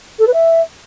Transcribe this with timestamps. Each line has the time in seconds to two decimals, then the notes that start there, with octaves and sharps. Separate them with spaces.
0.19 A4
0.26 B4
0.33 E5